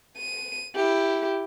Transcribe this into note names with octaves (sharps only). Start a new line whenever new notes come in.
D#7
E4 G4